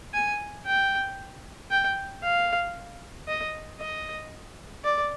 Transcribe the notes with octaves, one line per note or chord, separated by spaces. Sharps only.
G#5
G5
G5
F5
D#5
D#5
D5